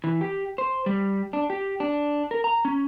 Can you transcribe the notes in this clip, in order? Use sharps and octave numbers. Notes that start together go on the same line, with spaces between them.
E3
G4
C5
G3
D4
G4
D4
A#4
A#5
C#4